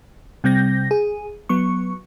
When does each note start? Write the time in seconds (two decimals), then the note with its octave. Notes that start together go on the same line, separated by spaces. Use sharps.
0.44 C3 G3 C4 G6 A#6
0.91 G#4
1.49 F#3 B3 C#6